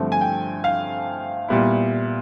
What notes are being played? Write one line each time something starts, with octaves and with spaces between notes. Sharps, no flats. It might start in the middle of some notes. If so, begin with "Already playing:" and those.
Already playing: G2 D3 F3 A3 C4
G#5
G5
F5
A#2 G3 B3 E4